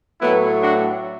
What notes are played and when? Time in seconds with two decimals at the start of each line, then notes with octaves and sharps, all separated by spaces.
0.21 A2 F#3 A3 B3 E4
0.62 D4 F#4